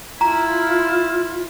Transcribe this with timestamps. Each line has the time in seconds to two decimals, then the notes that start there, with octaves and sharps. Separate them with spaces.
0.21 E4 F4 A#5